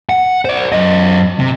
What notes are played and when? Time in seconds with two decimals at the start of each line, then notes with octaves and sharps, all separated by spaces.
0.09 F#5
0.45 C5 D5
0.72 F#2 D#5
1.39 C3